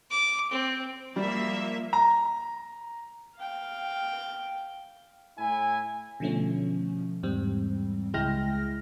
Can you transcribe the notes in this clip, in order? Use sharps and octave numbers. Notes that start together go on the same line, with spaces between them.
D6
C4
F3 G3 A#3 E5
A#5
F5 G5
A2 E4 G#5
B2 D3 F3 A3 C#4
E2 G#2 G3 C4
C#2 G#3 E4 G5 F6 A#6